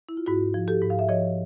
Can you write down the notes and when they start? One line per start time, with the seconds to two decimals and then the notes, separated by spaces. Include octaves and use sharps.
0.09 E4
0.17 F4
0.26 G#2 E4 F#4
0.54 F3
0.68 G4 A4
0.82 G#2
0.90 F5
0.99 E5
1.09 F3 C#5 D#5